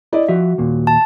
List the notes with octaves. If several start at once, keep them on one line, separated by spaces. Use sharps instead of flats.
E4 D5 D#5
F3 F#4 E5
D#2 A#2
A5